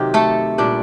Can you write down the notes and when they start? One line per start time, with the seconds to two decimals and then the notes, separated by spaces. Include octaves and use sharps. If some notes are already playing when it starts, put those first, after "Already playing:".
Already playing: C3 D#3 F#3 G4
0.14 A3 A4
0.58 A#2 G3 D4